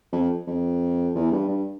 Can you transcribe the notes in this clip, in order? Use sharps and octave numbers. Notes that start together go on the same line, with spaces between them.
F2
F2
E2
G2
G2